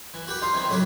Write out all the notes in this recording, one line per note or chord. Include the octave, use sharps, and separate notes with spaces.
E3
F#4 G4 B4
D#4 F4 C5
D#3 E3 C4
A2 C#3 F#3 F#4 G4 A4